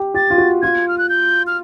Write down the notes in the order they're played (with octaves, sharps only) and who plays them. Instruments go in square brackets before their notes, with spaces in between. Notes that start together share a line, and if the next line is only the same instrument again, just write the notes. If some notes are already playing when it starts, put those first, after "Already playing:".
Already playing: [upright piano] G4
[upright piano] G4 [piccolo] A6
[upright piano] F4
F#4
[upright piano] F4 [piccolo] G#6
[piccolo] F6
F#6
G6
F6